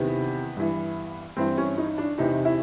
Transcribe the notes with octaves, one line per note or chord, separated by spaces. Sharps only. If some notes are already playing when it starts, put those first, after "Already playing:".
Already playing: E2 C3 D#3 B3
G2 E3
G2 E3 C4
C#4
D#4
D4
E2 C3 E3 D#4
E4